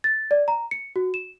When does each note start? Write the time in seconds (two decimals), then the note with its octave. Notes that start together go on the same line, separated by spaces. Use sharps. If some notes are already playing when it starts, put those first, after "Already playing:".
0.04 A6
0.31 D5
0.48 A#5
0.71 C#7
0.96 F#4
1.14 E7